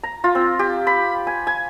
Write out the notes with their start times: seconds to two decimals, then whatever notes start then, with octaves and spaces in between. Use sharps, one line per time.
0.03 A#5
0.24 F4
0.35 C4
0.59 G4
0.87 B5
1.27 G#5
1.47 G#5